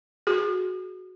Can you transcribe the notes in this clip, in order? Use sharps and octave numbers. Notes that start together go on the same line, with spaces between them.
F#4 G#4